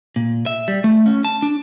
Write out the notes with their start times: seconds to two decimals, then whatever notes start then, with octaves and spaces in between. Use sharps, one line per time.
0.16 A#2
0.46 E5
0.68 G3
0.84 A3
1.06 C#4
1.25 A5
1.42 D4